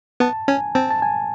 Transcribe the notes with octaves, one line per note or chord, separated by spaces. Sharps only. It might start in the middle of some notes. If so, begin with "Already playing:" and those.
B3 A5
C#4 G#5
C4 A5
A5
G#5